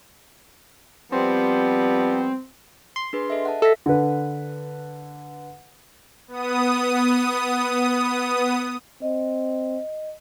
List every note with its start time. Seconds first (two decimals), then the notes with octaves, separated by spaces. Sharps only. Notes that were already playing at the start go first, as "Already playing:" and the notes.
1.12 F3 G3 B3 C4
2.96 C6
3.13 D4 G#4 B4
3.30 A4 D#5 E5
3.45 F#5 A5
3.62 A4 E5 A#6 B6
3.86 D3 B4
6.28 B3 D#6
9.02 C4 D#5